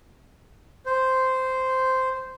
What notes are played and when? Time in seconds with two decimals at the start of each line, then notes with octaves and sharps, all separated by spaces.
0.86 C5